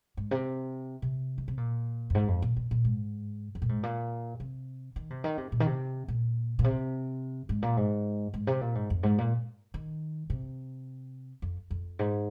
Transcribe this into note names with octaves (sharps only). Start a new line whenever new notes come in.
G#2
C3
C3
D#3
C3
A#2
F2
G#2
F2
A#2
A#2
A#2
G#2
F2
A#2
G#2
A#2
C3
D#3
C3
D#3
C3
A#2
D#3
C3
A#2
A#2
C3
G#2
A#2
G#2
G#2
C3
A#2
G#2
F2
G#2
A#2
D#3
C3
F2
F2
G#2